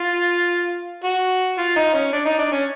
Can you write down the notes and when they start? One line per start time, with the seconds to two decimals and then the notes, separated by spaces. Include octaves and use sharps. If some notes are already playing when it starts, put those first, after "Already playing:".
Already playing: F4
1.04 F#4
1.58 F4
1.76 D#4
1.94 C#4
2.13 D4
2.26 D#4
2.39 D4
2.52 C#4